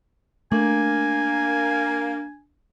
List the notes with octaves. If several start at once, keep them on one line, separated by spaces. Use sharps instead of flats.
A3 A#3 D4 G#5